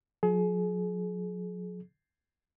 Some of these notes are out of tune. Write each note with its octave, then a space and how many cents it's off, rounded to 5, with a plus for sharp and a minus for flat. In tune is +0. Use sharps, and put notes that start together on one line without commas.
F#3 -45 G#4 +35